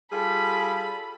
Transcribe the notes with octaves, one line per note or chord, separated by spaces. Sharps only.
G3 F4 G#4 A4 B5